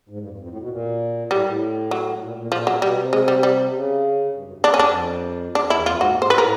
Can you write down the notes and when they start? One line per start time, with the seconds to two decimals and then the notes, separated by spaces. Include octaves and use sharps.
0.09 G#2
0.19 G2
0.29 F2
0.40 F2
0.49 A2
0.60 B2
0.69 A#2
1.30 A2 G3
1.46 A2
1.91 F#3
2.22 A#2
2.37 A#2
2.52 A#2 F3
2.67 F#3
2.82 B2 G3
2.98 C3
3.13 G#3
3.28 G3
3.43 G3
3.73 C#3
4.34 G2
4.45 F#2
4.54 G2
4.64 D4
4.74 E2 C#4
4.79 D4
4.85 F2
5.55 E2 D4
5.70 E2 E4
5.86 F2 F4
5.96 G#2
6.01 F#4
6.06 A#2
6.15 A2
6.22 G#2 C5
6.30 A2 B4
6.38 A#4